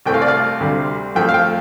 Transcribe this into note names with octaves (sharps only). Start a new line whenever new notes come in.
C2 C3 A3 C4 G5
F5
D5
F5
D2 C3 G3
F2 F3 A3 G5
F5
G5